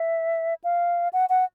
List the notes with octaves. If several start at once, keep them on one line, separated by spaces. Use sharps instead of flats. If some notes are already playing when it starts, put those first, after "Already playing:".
Already playing: E5
F5
F#5
F#5